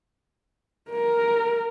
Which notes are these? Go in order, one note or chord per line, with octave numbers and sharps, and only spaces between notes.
A#4